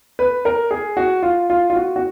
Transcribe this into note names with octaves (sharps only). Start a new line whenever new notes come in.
B4
A#4
G#4
F#4
F4
F4
F4
F#4
F#4